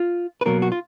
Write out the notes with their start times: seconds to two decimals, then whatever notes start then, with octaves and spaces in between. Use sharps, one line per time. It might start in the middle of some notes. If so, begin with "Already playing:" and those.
Already playing: F4
0.41 B4
0.46 B2 F#3 A#3 A#4
0.62 F#4
0.72 F4